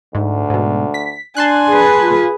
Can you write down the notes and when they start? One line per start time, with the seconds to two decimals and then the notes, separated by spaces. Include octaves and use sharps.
0.15 D2 G#2
0.50 G#2 B2
0.94 B6
1.37 D4 G#5 A5 C6 F#6
1.69 G#4 B4
2.02 F4